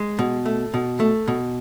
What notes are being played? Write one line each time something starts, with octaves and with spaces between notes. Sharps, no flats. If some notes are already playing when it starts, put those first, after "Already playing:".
Already playing: G#3
B2
A3
B2
A3
B2